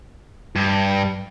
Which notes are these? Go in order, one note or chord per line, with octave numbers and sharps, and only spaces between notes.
G2